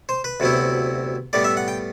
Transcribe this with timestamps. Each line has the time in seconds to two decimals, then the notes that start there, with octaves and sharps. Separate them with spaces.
0.09 C5
0.24 B4
0.40 D2 C3 F#3 B3 E4
1.33 A2 G3 B3 D5
1.44 E5
1.57 F#5
1.68 G5